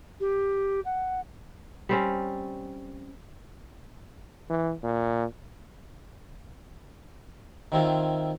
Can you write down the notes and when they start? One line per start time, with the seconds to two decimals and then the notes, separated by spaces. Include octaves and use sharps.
0.20 G4
0.85 F#5
1.89 G3 C4 C#4
4.50 E3
4.83 A#2
7.72 D#3 C4 E4 F4